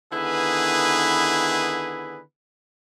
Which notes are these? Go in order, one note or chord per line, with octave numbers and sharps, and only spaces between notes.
D3 D#3 B3 E4 G#4 B4